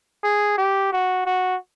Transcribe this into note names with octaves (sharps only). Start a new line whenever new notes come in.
G#4
G4
F#4
F#4